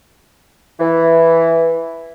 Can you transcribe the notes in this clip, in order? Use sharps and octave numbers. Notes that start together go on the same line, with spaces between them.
E3